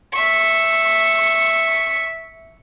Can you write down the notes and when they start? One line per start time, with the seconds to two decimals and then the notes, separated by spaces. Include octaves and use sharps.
0.12 E5 C#6